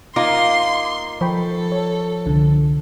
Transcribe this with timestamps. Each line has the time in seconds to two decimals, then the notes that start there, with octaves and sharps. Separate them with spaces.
0.16 A#3 D#4 F4 C6 D6
1.21 F3 A4 G5 B5 C#6
1.72 C#5
2.26 C2 D3